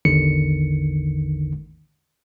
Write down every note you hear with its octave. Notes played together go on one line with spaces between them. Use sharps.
A1 E2 D3 D#3 C#7